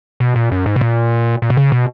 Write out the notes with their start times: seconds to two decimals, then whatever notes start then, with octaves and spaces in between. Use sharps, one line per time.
0.20 B2
0.36 A#2
0.51 F#2
0.66 G#2
0.76 B2
0.81 A#2
1.42 A#2
1.50 B2
1.57 C#3
1.72 B2